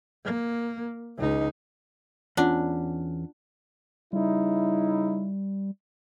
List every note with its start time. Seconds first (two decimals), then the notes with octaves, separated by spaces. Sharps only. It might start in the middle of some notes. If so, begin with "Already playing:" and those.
0.24 A#3
1.18 C#2 D#4
2.37 E2 C#4 D4 F4 F#5
4.13 C#3 G3 D#4 E4